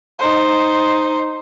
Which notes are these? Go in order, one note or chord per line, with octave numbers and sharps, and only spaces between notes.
D#4 C5